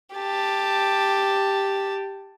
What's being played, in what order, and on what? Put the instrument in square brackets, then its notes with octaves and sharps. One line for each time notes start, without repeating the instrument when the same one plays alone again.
[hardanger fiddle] G4 A5